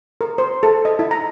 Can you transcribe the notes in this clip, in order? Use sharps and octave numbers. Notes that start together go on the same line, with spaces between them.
A#4
C5
A4
D#5
E4
A#5